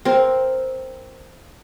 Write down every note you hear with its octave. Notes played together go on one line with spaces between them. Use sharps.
C4 A#4